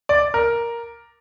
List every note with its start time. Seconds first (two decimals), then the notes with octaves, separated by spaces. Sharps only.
0.09 D5
0.34 A#4